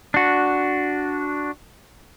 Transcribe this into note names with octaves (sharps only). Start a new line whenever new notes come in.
D4 F#4